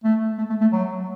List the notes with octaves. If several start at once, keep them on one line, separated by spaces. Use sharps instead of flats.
A3
A3
A3
A3
F#3